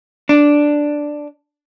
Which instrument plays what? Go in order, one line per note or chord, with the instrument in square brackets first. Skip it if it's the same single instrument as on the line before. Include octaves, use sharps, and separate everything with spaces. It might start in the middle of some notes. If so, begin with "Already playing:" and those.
[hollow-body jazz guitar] D4